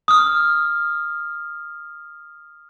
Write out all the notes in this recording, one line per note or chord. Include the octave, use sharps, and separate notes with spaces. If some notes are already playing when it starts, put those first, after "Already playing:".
D#6 F6